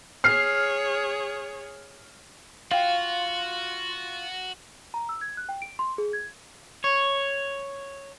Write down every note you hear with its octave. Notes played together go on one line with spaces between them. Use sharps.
G#4 C#5 F6 C7
F4 F#4 F5 G5
A#5
E6
G#6
F#6
G5
D7
C6
G#4
G#6
C#5